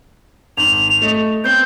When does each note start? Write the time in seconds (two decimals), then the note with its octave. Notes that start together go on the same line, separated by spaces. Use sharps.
0.57 G#1 F7 F#7
1.02 A3 D#5
1.44 B3 C4 G6